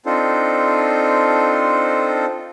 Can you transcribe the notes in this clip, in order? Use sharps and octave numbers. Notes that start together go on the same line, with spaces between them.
C4 D4 D#4 F4 A4 C5